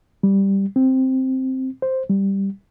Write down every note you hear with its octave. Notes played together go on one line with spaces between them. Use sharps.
G3
C4
C5
G3